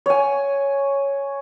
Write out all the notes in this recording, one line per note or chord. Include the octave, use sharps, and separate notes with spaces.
C#5 G#5